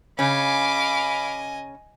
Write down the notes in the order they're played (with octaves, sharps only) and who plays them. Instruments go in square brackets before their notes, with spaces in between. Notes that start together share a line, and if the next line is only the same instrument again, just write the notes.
[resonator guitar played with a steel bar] C#3 C#4 [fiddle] D#5 G#5 [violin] F5 D6 [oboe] B5